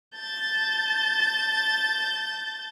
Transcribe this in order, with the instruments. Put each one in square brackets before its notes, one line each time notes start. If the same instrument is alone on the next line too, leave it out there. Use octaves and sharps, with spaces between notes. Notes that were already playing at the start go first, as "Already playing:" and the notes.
[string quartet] A5 G6 A6